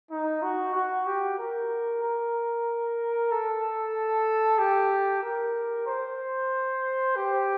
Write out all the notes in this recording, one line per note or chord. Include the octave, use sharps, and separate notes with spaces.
D#4
F#4
F#4
G4
A#4
A#4
A4
G4
A#4
C5
G4